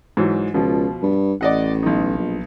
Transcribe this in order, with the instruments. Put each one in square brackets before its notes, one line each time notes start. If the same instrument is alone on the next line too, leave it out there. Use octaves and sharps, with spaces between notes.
[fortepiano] G#2 E3 F#3
[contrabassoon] C#2 [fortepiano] B2 F3
[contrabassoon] G2
[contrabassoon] A1 [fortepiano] D5 D#5 F#5
[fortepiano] B1 D#4
[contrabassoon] A#1